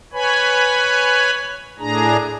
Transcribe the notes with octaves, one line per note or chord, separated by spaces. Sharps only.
B4 C#5 G#5 B5
A2 D4 G#4 A#5